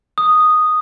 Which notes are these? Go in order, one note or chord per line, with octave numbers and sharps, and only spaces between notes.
D#6